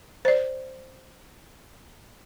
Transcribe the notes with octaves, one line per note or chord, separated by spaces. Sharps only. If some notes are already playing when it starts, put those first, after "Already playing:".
C5 D5